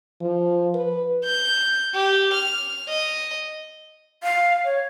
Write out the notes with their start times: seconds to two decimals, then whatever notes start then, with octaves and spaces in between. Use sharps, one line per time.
0.21 F3
0.75 B4
1.24 G6
1.95 G4
2.34 F6
2.89 D#5
4.23 F5
4.65 C#5